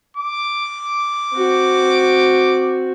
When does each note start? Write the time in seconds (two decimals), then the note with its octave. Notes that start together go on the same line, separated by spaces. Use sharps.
0.17 D6
1.34 C4 F#4